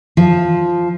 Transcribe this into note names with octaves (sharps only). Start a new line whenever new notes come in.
F3